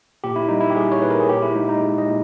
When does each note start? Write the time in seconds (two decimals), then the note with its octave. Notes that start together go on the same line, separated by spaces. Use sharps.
0.24 A#2 G4
0.36 E4
0.49 G3 D#4
0.60 E4
0.70 G4
0.76 G3 G#4
0.92 C#5
1.02 A#2 B4
1.10 A#4
1.20 G#4
1.29 A#2 G4
1.42 E4
1.55 G#3 D#4
1.69 D#4
1.81 G#3
1.98 D#5
2.08 A#2